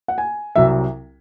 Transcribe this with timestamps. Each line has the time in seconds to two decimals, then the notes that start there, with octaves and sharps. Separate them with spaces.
0.08 F#5
0.18 G#5
0.55 C2 C3 F#3 E5